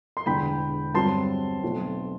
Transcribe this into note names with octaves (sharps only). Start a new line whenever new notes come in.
C6
E1 E2 D3 G5 B5
G2 F#3 C4 A5 C6
B1 B2 A3 C4